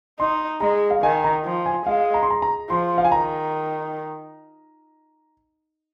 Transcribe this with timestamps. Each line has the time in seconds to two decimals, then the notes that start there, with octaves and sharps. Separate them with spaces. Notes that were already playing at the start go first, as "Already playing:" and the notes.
0.19 D#4 C6
0.61 G#3 A#5
0.90 F5
1.02 D#3 G#5
1.24 A#5
1.45 F3
1.66 G#5
1.86 G#3 F5
2.14 A#5
2.22 C6
2.30 A#5
2.42 A#5
2.70 F3 C6
2.98 F5
3.05 G#5
3.12 D#3 A#5